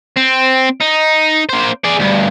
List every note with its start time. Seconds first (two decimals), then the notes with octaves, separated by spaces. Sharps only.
0.17 C4
0.80 D#4
1.49 A#3 C5
1.84 G#4 D5
1.99 D2 G2